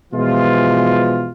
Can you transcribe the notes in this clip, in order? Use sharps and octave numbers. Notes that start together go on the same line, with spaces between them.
B2 E3 F3 G#3 F4